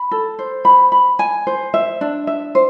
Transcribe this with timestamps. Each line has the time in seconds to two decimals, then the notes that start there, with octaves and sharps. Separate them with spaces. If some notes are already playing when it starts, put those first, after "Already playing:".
Already playing: B5
0.11 A4
0.39 C5
0.65 B5
0.92 B5
1.19 G#5
1.47 C5
1.74 E5
2.01 D4
2.27 E5
2.55 C5